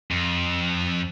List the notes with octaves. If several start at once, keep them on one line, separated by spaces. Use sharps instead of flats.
F2